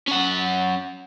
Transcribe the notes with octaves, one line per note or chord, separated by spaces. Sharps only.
C#4 F#5